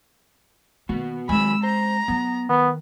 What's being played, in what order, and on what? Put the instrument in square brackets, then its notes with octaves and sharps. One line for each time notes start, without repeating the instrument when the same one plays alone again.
[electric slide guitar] B2 B3 F#4 [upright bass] D#3 A#3
[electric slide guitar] D#3 F#3 G#5 [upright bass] G#3 C4 [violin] B5 E6
[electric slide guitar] C5 [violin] A#5
[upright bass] F#3 [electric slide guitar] B3
[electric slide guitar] D#3 [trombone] B3